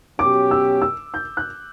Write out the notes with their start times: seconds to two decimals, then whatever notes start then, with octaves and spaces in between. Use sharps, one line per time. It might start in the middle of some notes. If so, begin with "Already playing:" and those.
0.19 B2 F#3 C#4 G4 D6
0.51 E6
0.82 E6
1.14 G6
1.37 F#6